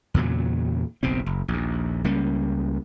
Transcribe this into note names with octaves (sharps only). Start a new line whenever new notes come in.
E2 A#2 C#3 F#3
F#1 B1 B2 C4
F#1
A#1 D#2
C#2 G3 A#3 C#4